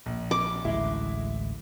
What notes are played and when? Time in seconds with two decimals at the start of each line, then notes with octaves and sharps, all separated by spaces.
0.06 A#1
0.31 D6
0.65 A1 D2 G#3 E4